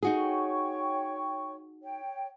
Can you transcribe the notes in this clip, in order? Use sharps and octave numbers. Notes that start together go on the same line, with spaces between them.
D#4 F#4 G#4
C#5 G5 C#6
C#5 G5